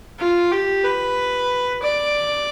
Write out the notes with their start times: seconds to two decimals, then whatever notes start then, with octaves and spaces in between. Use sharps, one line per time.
0.19 F4
0.52 G4
0.84 B4
1.82 D5